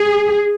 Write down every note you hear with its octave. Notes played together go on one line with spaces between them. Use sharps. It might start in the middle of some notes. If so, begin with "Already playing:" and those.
Already playing: G#4